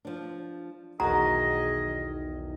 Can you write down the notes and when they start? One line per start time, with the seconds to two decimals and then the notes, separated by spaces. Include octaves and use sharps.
0.05 F3 D4
1.00 B1 E2 D#3 F#4 G#4 D#5 A#5